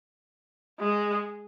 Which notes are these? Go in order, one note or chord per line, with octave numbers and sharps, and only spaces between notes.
G#3